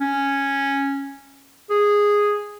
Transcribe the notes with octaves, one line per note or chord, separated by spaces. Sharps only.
C#4
G#4